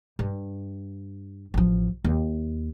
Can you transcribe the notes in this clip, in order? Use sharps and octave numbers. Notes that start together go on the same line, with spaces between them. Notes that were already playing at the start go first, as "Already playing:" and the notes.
G2
A1 F3
D#2